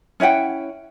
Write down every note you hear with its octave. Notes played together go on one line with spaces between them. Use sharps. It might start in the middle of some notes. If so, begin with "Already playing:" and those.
C#4 E4 F#5 G5